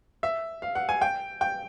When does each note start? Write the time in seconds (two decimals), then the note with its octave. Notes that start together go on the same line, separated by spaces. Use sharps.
0.23 E5
0.62 F5
0.75 F#5
0.89 G#5
1.01 G5
1.41 G5